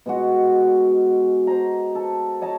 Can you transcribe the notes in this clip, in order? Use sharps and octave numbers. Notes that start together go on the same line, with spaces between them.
B2 G#3 F#4
C5 D#5 A#5
A4
C#5 D#5 A5 A#5